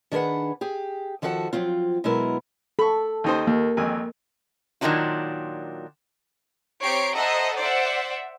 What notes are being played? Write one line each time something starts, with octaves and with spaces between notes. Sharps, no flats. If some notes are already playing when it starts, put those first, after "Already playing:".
D#3 D4 G#4 B4 F#5
G4 G#4
D#3 F3 F#4 A4 F#5
F3 F#3 C4 F4
B2 F#3 G#3 B3 E4 A#4
A4 B5 C#6
D#2 D#4 C5
D#2 A#3
G#1 F2 G#5
A#2 D#3 F#3 A3 D4 F4
C4 G4 C#5 A#5 C7 D7
A4 C5 D#5 E5 F#5 A#5
C5 D5 E5 F#5